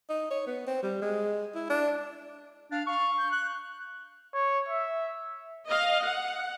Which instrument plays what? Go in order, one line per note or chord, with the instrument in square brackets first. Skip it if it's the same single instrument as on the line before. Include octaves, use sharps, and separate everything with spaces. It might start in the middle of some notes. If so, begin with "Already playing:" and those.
[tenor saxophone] D#4
C#5
B3
C4
G3
G#3
E4
D4
[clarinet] D4 [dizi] F5
[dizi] F5 [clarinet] C#6
[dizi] G6
F#6
[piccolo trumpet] C#5
E5
[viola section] D#5 F5
F#5